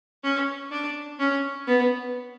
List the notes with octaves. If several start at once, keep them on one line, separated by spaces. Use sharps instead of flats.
C#4
D4
C#4
B3